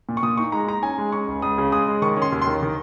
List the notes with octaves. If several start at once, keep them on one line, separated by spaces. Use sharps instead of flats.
A#2
C#6
A#2 D#6
D#4 C#6
G#3 A#5
D#4 A#5
C#4 G#5
G#3
C#4 C#6
C#2
C#2 D#6
C#3
G#3 D#6
G#3
D#3 C#6
C#4
C6
D#2
C6
D#3
D#3